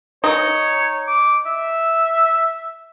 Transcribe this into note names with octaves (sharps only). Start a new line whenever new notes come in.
D#4 C#5
D6
E5